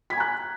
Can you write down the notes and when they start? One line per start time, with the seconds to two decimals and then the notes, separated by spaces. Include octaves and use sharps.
0.10 B6
0.13 G#6
0.15 G#5
0.18 A#5
0.20 F#6